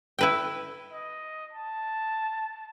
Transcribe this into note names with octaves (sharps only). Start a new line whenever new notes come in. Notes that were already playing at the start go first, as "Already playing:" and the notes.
E4 B4 G5
D#5
A5